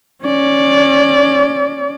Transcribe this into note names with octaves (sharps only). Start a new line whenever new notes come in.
C#4 D5